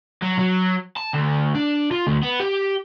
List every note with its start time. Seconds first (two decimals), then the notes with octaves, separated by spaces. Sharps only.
0.22 F#3
0.39 F#3
0.97 A5
1.13 D2
1.55 D4
1.91 F4
2.07 D2
2.23 B3
2.40 G4